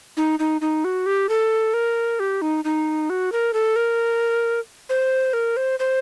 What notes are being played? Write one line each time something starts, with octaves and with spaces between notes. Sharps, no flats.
D#4
D#4
D#4
F#4
G4
A4
A#4
G4
D#4
D#4
F#4
A#4
A4
A#4
C5
A#4
C5
C5